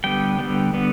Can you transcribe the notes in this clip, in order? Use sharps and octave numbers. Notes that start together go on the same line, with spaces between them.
D3 G3 B3 G5
D3 G3 B3
D3 G3 B3